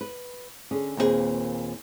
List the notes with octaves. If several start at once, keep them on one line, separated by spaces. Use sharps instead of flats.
B4
D3 C#4 G#4
D#2 A#2 C4 D4 G#4 B4